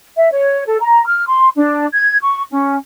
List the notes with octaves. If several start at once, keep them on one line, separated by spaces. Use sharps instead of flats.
E5
C#5
A4
A#5
F6
C6
D4
G#6
C#6
C#4